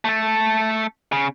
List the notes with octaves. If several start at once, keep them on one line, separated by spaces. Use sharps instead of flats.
A3 A4
C#3